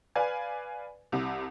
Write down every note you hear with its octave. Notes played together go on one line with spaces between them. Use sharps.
B4 D5 F5 G#5
C2 C3